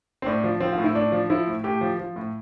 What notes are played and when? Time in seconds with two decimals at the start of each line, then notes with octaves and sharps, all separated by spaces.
0.22 C4
0.26 A2 D4
0.44 F3
0.60 F3 C4
0.73 F4
0.78 A2
0.84 E4
0.95 A2 D4
1.12 F3
1.30 F3 E4
1.47 A2
1.64 A2 G4
1.81 F3
1.99 F3
2.16 A2